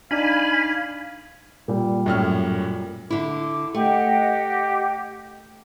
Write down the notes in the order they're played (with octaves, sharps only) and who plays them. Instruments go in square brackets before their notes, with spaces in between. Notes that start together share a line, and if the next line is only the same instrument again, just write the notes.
[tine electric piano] D4 D#4 D5 [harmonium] F5 [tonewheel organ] G#5 B5
[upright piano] A#2 G3
[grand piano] F#2 A2 F6
[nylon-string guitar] D3 E4 [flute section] D6
[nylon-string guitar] A3 [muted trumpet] G4 [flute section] D#5 F#5 G5